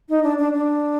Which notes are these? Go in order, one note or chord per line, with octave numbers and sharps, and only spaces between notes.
D#4
D4
D4
D4